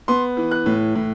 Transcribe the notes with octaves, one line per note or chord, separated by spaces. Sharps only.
B3 C6
E3
F#6
A2
A2